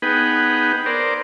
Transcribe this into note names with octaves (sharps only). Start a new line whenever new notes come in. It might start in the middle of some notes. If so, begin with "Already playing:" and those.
B3 D#4 G#4 B4 F#5 G5
A#4 C5 D5